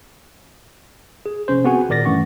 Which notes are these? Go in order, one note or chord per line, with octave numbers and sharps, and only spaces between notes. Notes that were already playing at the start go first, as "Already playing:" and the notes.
G#4
A#1 C3 C#4 C5
B3 C4 F#4 G#4 F#5 G#5
G#1 A#2 A#4 D5 A6 A#6
G2 E3 A3 C#4 F#5 C#6